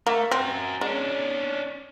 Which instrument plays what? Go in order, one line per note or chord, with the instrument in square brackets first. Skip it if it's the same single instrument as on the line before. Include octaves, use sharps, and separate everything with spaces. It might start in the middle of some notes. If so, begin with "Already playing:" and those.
[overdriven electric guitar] A3 [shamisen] A#3
[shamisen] C4 [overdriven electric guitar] F#4 A#4
[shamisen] G#3 [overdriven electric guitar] C#4 D4